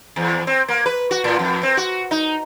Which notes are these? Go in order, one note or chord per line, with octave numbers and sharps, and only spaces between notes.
E2
C4
A#3
B4
F#4
A2
F2
C4
F#4
D#4